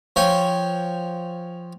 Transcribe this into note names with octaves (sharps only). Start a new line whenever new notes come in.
F3 C#5 G5 G#5